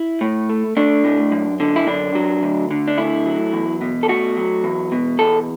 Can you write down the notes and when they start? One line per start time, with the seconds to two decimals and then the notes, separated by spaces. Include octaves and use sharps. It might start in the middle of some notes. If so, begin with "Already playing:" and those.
Already playing: E4
0.21 A2
0.49 A3
0.77 A3 D4
1.04 A2
1.32 F#2
1.60 D3
1.76 E4
1.87 F#2 D4
2.15 F#3
2.43 D2
2.71 D3
2.88 D4
2.98 A3 E4
3.26 F#3
3.53 E2
3.81 B2
4.03 A4
4.08 A3 F#4
4.37 F#3
4.64 E2
4.92 B2
5.19 E2 A4